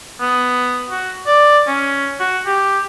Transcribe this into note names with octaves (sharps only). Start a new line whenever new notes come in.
B3
F#4
D5
C#4
F#4
G4